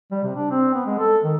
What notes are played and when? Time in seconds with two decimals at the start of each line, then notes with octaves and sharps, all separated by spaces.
0.11 G3
0.23 C3
0.36 D4
0.50 C4
0.74 B3
0.86 G#3
0.99 A4
1.24 D#3